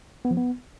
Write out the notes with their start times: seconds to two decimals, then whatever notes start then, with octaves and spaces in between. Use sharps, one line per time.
0.25 B3
0.31 F3
0.37 B3